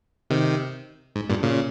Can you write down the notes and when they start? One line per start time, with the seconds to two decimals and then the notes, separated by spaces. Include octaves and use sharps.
0.30 C3 D#3
1.16 G#2
1.30 G2 A#2
1.43 A#2 C#3